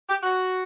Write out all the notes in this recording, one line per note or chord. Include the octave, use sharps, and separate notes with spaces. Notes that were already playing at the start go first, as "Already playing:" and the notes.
G4
F#4